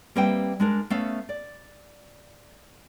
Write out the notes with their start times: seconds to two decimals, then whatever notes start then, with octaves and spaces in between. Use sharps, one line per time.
0.16 G3 A#3 C4 B4 E5 G5
0.60 G#3 D4 A#4
0.90 A3 B3 C#4 E5 F5
1.29 D5